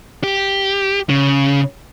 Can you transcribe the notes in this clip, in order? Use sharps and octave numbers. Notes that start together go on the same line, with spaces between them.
G4
C#3